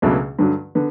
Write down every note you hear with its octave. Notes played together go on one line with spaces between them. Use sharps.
C#2 B2 F#3 A3 D4
G2 D3 F#3
D3 B3